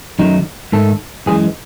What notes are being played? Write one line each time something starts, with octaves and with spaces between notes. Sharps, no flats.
F#2 D#3 F#3 A3 D#4
G#2 D#3 A3 A4
F#2 E3 G#3 G#4